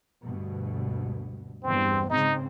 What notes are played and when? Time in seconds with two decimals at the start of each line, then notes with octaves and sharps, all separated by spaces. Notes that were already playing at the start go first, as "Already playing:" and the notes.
0.24 D2 G2 B2
1.64 E2 G2 C4
2.10 G#2 C#3 C4 D#4